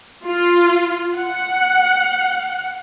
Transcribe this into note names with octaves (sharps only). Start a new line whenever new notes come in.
F4
F#5